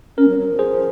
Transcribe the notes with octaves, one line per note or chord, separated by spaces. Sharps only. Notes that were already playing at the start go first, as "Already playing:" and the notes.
C#4 A#4
F#3
F#3
F3
G#4 C5